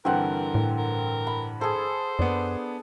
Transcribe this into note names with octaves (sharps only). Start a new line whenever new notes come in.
G2 D3 E3 C4 A#4 F#5
A2
A#4
B5
G#4 A4 C5
F#2 B3 D4